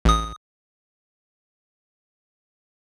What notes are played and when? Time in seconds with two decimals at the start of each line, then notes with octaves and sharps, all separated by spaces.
0.05 A1 D#6